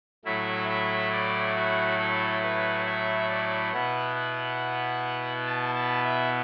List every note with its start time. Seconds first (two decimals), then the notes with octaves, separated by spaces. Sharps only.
0.25 A2 F#3 A3 E4 E5
0.69 E5
1.13 D5
1.56 F#4
1.99 A4
2.43 B4
2.86 E5
3.29 D5
3.73 B2 B3 E4 F#5
4.16 F#5
5.47 A5
5.75 A5
6.05 E5